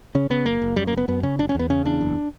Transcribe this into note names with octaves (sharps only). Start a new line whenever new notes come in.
C#3 C#4
C#3 B3
F#1 A#3
F#1
F#2 G3
A#3
F#1 B3
F#2 B3
C#3 C#4
F#1 D4
C#4
E2 B3
C#3 C#4
E2 D4
F#1